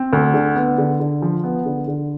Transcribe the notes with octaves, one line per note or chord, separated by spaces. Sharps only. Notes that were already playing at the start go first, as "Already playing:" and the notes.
Already playing: C4
D2
D3
B3
D3
D3
F3
B3
D3
D3